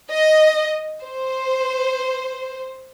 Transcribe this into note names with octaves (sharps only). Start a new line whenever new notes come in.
D#5
C5